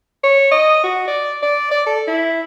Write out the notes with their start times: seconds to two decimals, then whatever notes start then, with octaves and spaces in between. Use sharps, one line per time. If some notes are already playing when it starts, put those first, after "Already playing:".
0.24 C#5
0.51 D#5
0.84 F#4
1.07 D5
1.42 D5
1.71 D5
1.87 A4
2.07 E4